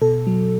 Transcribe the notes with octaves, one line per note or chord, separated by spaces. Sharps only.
B2 A4
F#3